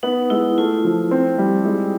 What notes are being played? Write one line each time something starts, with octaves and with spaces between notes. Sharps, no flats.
B3 D#4
G#3 E4
A3 F4
F3
C4
G3
G#3